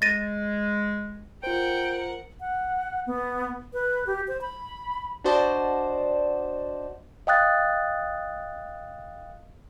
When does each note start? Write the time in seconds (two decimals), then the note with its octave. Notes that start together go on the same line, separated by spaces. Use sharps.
0.02 G#3 A6 A#6 D#7
1.43 F4 A#4 C5 F#5 G5
2.40 F#5
3.07 B3
3.73 B4
4.07 G4
4.28 C5
4.41 B5
5.24 D4 F#4 C5 D5 D#5 A5
7.27 D#5 F5 G5 D#6 F#6 A6